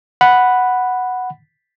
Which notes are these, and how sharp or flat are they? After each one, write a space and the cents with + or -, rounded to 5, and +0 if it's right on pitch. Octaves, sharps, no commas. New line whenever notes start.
F#5 +0 B5 +0